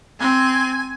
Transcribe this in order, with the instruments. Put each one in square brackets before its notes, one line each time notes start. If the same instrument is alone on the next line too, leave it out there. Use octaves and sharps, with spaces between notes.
[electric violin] C4 [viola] G#5